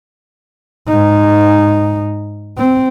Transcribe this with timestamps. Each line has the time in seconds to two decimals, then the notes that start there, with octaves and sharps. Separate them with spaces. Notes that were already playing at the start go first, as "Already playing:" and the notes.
0.88 G#2 D#4
2.58 C4